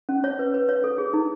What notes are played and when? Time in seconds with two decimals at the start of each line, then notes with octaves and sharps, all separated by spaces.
0.09 C#4
0.24 C#5
0.39 B4
0.54 B4
0.69 C#5
0.84 A4
0.98 G#4
1.14 D#4